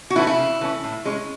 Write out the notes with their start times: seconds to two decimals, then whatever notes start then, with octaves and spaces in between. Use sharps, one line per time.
0.10 F#4
0.16 E3 A3 C#4 E4
0.27 E4
0.38 C#3
0.61 E3 A3 C#4
0.84 A2
1.05 G#3 C#4